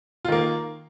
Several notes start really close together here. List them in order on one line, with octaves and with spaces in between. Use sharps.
F4 D#3 A#3